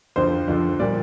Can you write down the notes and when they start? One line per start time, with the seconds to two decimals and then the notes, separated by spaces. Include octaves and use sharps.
0.16 F2 D3 F3 C5
0.48 F2 D3 F3
0.79 A#2 G3 D5